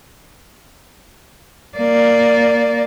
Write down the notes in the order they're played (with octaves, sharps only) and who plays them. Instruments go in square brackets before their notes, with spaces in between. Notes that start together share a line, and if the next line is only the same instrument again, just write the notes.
[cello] A#3 D5